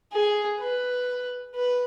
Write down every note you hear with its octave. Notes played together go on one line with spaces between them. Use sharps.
G#4
B4
B4